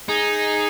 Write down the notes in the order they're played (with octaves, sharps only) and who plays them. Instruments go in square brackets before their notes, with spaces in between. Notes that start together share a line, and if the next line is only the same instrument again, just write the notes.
[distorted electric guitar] D#4 [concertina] G#4